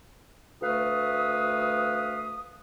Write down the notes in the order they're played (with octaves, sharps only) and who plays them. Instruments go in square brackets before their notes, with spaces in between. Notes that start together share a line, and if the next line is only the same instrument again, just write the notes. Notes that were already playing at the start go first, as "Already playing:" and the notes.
[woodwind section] D2 A3 B4 F5 D#6